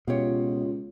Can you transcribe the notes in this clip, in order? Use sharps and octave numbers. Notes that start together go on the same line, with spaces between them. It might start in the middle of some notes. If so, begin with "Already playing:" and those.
C#2 B2 F4 G4 C#5